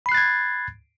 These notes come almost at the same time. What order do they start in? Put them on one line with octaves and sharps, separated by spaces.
B5 C7 F#6 A6 G#6